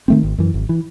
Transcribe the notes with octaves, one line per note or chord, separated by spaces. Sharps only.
D#3 A3 C4
G#1
F#2 E3
G#1
E3